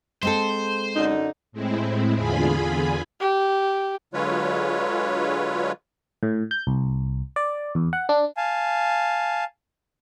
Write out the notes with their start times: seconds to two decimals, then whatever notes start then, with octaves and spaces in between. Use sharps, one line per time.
0.23 G#3 C4 A4 C5
0.96 F#2 D3 D#4
1.52 A2 G#3 C4 E4
2.15 E2 D3 F4 G#4 G#5 B5
3.21 G4
4.14 D3 F#3 G#3 F4 B4 C#5
6.23 A2
6.51 G6
6.67 C2
7.36 D5
7.75 E2
7.93 F#5
8.09 D4
8.37 F5 G#5 A5